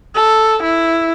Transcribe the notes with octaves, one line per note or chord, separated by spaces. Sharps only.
A4
E4